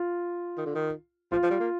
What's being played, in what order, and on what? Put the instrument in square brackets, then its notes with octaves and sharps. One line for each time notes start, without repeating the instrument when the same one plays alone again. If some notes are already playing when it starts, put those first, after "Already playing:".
Already playing: [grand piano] F4
[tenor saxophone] D#3
D3
D#3
[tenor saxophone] F3 [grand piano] F4
[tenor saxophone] F3
G3
A#3